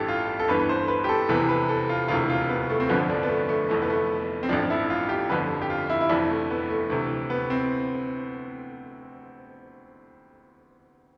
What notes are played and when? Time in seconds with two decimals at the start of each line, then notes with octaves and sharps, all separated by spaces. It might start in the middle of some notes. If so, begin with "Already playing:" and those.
Already playing: A1 G2 E3 G4 A4
0.08 F4
0.39 A4
0.48 G1 G2 E3 B4
0.60 B4
0.69 C5
0.88 B4
1.04 G4
1.09 A4
1.29 F1 E2 C3 E3 B4
1.49 B4
1.69 A4
1.89 F4
2.08 E1 D2 C3 E3 F4
2.30 F4
2.49 B3
2.70 A3
2.80 C4
2.89 G1 F2 D3 F3 B3
3.10 D4
3.23 B3
3.29 A3
3.49 A3
3.69 F1 F2 E3 A3
3.82 B3
3.90 A3
4.43 C4
4.49 A1 G2 F3 D4
4.70 E4
4.90 F4
5.09 G4
5.30 G1 F2 D3 B4
5.62 G4
5.70 F4
5.90 E4
6.01 E4
6.09 F1 F2 E3 D4
6.30 A3
6.50 B3
6.70 A3
6.90 D2 C3 E3
7.30 B3
7.50 C4